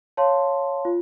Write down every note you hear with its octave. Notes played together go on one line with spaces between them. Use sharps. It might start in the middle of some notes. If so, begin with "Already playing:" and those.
C#5 F5 A5 C6
F4